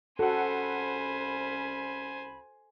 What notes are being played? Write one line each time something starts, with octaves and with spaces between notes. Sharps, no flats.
C2 C#4 F#4 A4 C5 F#5 G#5 B5